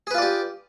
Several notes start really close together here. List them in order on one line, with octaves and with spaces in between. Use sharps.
G#4 B4 F4 D5 G4